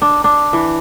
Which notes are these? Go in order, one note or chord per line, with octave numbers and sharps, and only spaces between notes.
D4
D4
E3